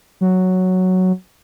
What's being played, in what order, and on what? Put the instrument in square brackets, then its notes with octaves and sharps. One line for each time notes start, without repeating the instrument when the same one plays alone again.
[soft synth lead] F#3